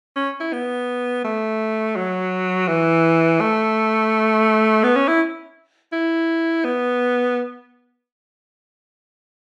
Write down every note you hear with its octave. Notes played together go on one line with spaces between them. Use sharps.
C#4
E4
B3
A3
F#3
E3
A3
B3
C#4
E4
E4
B3